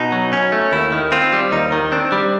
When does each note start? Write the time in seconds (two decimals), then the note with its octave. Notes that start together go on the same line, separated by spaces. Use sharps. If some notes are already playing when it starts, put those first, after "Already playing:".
Already playing: B2 D#4
0.12 F#3
0.33 C#4
0.52 A3
0.72 D#2 E4
0.92 D#3
1.12 C4 F4
1.33 G3
1.52 D#2 D#4
1.72 D#3
1.92 C4 D4
2.12 G3